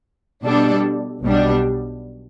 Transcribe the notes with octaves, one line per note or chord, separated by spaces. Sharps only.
B2 G3 D4 A4
B1 B2 G3 D4